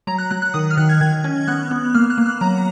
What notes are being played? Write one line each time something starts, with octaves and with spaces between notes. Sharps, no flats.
F#3 A#5
F#6
F#3 F#6
F#6
D#3 D#6
F6
D#3 F#6
G#6
D#3 G#6
C#4
B3 F#6
B3
A#3 F6
F#6
A#3
F6
F#3 A#5